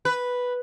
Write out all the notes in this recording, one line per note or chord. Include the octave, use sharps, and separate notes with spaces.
B4